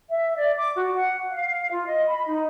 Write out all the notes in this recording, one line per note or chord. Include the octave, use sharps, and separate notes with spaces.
E5
D5
D6
F#4
F#5
F5
F4
D#5
B5
D#4